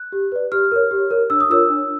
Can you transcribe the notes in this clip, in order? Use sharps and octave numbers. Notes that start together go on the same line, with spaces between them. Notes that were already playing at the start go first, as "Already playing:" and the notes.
Already playing: F#6
G4
B4 D5
G4 F6
A#4 C#5
G4
A#4 C#5
D4 E6
D#6
F4 A#4 C#5 E6
D4